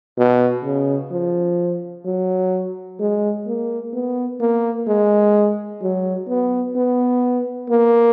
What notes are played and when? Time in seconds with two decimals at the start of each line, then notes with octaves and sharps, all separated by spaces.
0.17 B2
0.64 C#3
1.12 F3
2.05 F#3
3.00 G#3
3.47 A#3
3.93 B3
4.40 A#3
4.87 G#3
5.81 F#3
6.29 B3
6.75 B3
7.69 A#3